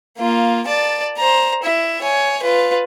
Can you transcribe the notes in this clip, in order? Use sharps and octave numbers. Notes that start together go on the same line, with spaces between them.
A#3 F4
D5 A5
C5 A#5
E4 E5
C#5 G#5
F4 B4